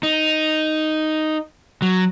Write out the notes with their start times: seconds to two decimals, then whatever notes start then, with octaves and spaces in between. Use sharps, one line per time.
0.03 D#4
1.82 F#3